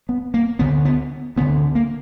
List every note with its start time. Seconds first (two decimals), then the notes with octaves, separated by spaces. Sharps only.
0.09 B3
0.34 A#3
0.59 D2 D3 B3
0.85 B3
1.36 D2 B3
1.40 D3
1.75 A#3